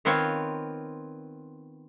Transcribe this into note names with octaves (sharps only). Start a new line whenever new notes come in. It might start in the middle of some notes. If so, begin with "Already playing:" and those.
D#3 B3 C4 F4 C#5